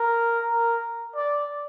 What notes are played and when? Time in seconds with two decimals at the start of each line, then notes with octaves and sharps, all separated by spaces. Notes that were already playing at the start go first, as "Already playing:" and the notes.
Already playing: A#4
0.47 A#4
1.16 D5